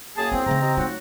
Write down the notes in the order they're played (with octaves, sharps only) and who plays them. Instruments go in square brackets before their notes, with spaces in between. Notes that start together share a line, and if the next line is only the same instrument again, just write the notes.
[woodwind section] F#2 A#3 G#4 [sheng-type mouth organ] A5
[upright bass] B3 E4 [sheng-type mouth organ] C4
[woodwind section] G#2 A3 A#5 [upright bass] C#3 E3
[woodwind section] G4 D#5 A#5
[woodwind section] F#3 D#4 F#4 [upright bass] A3 F4